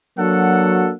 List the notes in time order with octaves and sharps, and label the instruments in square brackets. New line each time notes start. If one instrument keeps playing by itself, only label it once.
[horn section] F#3 A#3 D4 F#4 A4 F#5